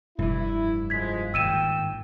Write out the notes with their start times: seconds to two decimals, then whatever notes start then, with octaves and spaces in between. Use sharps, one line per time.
0.19 F1 G2 E3 E4
0.90 D#2 F3 G#3 G#6 B6
1.34 G#1 G2 A#2 G5 E6 D#7 E7